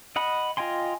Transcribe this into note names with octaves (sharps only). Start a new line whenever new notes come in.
D#5 F#5 B5
F4 D#5 G5 G#5 C6